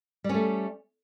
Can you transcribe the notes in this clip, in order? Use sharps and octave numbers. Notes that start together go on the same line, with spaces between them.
G3 A3 C#4